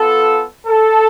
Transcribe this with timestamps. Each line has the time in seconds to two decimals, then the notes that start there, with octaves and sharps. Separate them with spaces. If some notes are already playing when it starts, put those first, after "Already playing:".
Already playing: B3 F4 A4
0.66 A4